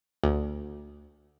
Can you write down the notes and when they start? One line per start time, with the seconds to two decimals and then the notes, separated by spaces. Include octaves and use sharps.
0.24 D2